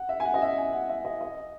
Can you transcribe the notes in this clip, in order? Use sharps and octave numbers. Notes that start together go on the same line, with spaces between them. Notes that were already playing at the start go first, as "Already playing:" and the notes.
Already playing: F#5
E5
G#5
F#5
D#5
E5
G#5
F#5
E5
D#5
D#5